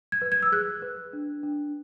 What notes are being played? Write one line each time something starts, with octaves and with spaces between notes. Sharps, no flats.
G#6
B4
G#6
E6
G#4 F#6
B4
D4
D4